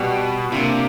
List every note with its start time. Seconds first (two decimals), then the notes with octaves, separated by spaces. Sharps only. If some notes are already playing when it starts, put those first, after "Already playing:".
Already playing: B2 G3 B3
0.52 C3 A#3 D4 F4